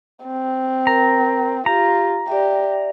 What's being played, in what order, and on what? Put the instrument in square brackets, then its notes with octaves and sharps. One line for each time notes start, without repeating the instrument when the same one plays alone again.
[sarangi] C4
[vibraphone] A#4 [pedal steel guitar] A#5
[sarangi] F4 [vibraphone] G4 [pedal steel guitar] A#5
[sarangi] G4 [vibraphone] D5 E5